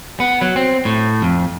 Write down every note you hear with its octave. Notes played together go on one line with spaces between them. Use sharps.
B3
F#3
C4
A2
F2